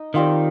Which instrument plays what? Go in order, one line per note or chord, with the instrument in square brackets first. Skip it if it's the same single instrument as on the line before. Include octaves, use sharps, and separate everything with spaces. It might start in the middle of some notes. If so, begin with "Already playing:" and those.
Already playing: [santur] D#4 D#5
[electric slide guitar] D#3 [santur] G3 C4 F4